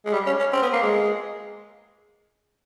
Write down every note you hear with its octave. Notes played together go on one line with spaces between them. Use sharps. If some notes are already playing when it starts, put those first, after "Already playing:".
G#3
G3
C#4
C#4
C4
B3
A#3
G#3